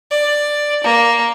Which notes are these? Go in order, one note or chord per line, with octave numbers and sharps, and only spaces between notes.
D5
A#3